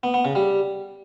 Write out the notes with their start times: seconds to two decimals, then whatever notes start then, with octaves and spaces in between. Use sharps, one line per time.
0.03 B3
0.14 B3
0.25 C#3
0.35 G3